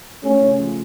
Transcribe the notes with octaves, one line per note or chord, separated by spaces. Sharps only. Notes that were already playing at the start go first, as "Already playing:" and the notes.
A3 C#4
C#3
F3